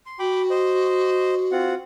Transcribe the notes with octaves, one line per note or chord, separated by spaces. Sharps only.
C6
F#4 G5 B5 D6
C5 D#5
C4 F4 F#5